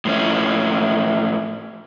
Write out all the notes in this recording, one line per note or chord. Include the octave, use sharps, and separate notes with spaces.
A2 F3 C#4